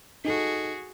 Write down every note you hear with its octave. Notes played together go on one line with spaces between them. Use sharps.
D#4 F#4 G#4 A4